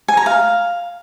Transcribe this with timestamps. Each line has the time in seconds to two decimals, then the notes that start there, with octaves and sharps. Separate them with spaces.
0.08 G#5
0.17 A#5
0.26 F5